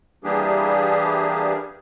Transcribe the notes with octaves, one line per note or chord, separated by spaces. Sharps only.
E3 G3 A#3 D4 G4 G#4